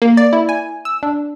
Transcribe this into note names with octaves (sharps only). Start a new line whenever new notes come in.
A#3
D5
E4
G#5
E6
D4